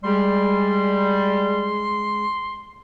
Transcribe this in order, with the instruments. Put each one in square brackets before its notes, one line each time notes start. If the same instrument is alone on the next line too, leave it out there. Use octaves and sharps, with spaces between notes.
[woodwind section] G3 [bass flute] G#3 [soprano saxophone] C6